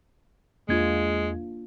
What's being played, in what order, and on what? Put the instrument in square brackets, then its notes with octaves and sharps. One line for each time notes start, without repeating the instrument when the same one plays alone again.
[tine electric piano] E2 G#6 [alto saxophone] G#3 [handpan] A#3 D4 F4